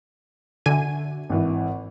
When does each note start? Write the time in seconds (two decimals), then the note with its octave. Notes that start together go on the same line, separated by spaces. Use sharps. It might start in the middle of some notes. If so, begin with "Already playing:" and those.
0.66 D3 F#4 E5 G#5 D#7
1.30 G#1 E3